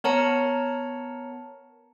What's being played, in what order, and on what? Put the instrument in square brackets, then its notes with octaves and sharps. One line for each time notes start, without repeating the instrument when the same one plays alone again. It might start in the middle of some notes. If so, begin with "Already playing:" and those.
[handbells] B3 A#4 C#5 A5 A#5 C#7